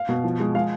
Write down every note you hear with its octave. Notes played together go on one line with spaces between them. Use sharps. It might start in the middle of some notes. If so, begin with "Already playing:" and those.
Already playing: F5
B2
F3
G#3
G#3 F5